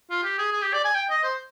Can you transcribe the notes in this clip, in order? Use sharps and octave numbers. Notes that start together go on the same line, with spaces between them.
F4
G4
G#4
G#4
G4
D5
G#5
G5
D#5
C5